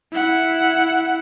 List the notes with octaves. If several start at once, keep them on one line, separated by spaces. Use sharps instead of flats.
E4 F#5